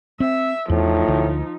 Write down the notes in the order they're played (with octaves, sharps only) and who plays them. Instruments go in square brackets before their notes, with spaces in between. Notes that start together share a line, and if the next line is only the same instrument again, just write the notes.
[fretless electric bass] C4 [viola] E5
[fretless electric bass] E2 [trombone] A2 [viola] F3 D#4
[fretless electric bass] D2